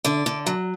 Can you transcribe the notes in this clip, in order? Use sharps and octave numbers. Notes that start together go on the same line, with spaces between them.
D3 D5
D3
F#3